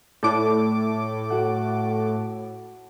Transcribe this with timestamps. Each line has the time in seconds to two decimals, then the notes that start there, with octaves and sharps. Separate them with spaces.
0.23 A2 A3 E4 A4 C#5 D6
1.30 F#4 F#5